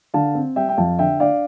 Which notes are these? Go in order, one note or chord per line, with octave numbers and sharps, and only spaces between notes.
D3 F5 A5
C4
G3 E5 G5
G5
F2 F5 A5
D3 E5 G5
D4 D5 F5